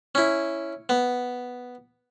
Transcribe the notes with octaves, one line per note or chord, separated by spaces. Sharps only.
C#4 E4
B3